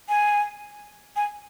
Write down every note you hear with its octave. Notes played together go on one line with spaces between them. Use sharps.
G#5
G#5